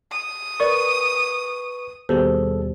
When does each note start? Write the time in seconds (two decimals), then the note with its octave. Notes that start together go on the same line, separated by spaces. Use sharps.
0.11 D#6
0.60 A#4 B4 D5 C#6
2.09 D#2 B2 G3 G#4 A4 C5